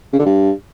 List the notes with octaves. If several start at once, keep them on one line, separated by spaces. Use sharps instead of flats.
C#3
D3
G2